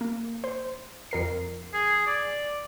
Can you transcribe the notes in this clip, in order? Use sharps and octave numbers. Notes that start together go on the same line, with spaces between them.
A#3
C5
F2 A#4 C7
G#4
D5